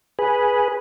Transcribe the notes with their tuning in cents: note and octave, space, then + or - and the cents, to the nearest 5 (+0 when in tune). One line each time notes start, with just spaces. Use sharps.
G#4 +0 B4 -10